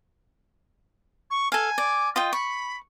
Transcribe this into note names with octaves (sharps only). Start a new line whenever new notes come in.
C#6
A4 F5 G#5
D5
F4 D#5 G5
B5 C#6